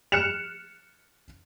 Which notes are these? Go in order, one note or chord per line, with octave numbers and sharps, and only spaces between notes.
F6 F#6 C#7 E7 F7